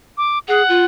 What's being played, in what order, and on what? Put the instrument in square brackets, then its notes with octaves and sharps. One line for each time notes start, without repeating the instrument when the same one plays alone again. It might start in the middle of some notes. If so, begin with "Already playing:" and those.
[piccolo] D6
[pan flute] G#4 [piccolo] F#5
[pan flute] F4